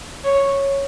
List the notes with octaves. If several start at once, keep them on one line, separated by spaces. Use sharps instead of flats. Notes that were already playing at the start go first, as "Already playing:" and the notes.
C#5